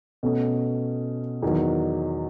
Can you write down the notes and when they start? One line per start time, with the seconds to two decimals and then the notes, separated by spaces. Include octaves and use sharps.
0.23 B2 A3 C#4
1.42 E2 D#3 F#3